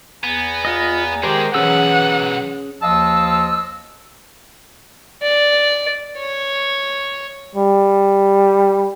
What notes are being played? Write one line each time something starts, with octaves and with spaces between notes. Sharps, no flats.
E2 B3 G#5 A#5
F4 D#5
D#3 G#3 G4 G#4 A#4 C5 D5
B1 E2 E3 F#3 C#4 G#4 F#5 E6
D#2 F3 D#5 F5 A5 E6
D5
C#5
G3